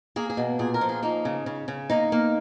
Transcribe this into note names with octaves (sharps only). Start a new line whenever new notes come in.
A#3 G#4
G#4
B2
A#2 G#4
A#4
F3
G#4
A#3 D#4
C#3
C#3
C#3
A#3 D#4
A#3